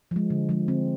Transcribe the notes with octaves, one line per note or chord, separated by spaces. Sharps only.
F3 G#3
D3
F3 G#3
D3 C4